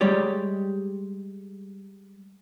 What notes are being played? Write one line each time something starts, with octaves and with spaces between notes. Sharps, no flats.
G3 G#3 G4 C#5 D5